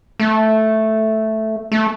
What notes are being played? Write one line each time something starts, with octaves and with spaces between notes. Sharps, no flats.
A3
A3